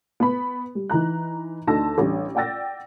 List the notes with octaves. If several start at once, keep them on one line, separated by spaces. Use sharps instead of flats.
B3 B5
G3
E3 D#4 A#5 F#6
D2 D4 D#4 A5 E6 A#6
A1 G3 D4
D5 F#5 G5 E6 A6 A#6